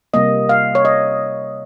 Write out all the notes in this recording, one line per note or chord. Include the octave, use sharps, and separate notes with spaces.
C3 G3 A#3 D#5
F5
C#5
D#5